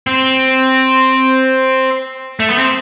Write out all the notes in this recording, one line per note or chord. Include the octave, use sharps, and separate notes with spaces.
C4
A3
B3
C4